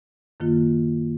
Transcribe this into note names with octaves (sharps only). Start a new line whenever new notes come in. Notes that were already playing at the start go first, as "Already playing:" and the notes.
F#2 D#3 A#3 F4